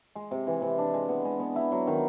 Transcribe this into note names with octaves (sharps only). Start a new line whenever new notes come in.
G#3
C3
E3
C3
D4
G#3
B3
G#3
B3
E4
F#3
D#3